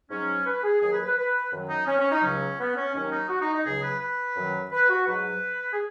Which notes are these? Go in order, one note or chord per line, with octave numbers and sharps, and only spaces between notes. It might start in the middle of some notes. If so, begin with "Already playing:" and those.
G#2 F#3 C#4
B4
G#4
D#2 D#3 F#3 G#4
B4
B4
B4
F#2 D#3 F#3
D#4
C#4
C#4
D#4
C#2 C#3 F#3 C#4
B3
C#4
D#2 D#3 F#3 C#4
D#4
F#4
D#4
D#4
C#2 C#3 F#3 G#4
B4
B4
F#2 D#3 F#3
B4
F#4
G#2 F#3 B4
G#4